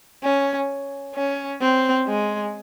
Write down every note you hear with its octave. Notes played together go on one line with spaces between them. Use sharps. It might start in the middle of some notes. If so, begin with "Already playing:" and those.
C#4
C#4
C4
G#3